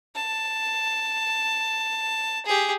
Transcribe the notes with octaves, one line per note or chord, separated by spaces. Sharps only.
A5
G4 G#4